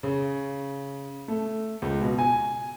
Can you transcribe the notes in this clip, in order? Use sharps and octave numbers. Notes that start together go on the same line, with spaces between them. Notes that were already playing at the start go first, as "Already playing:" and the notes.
C#3
A3
C#2
B2
G#5